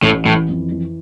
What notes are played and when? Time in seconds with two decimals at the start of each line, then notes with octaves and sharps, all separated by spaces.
0.02 A1 A2
0.25 A2 E3
0.49 F2
0.72 E3